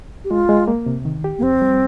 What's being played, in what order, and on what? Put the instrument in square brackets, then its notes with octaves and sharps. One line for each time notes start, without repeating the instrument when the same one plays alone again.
[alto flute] G4
[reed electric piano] G#3 [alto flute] F4
[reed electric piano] G#3
A#3
C3
D#3
G4
[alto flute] A#3
[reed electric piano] F2 [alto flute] C4
[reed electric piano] G3